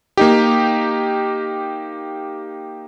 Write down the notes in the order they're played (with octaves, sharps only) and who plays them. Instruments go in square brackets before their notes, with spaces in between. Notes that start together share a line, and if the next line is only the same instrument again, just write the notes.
[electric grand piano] A#3 D#4 G4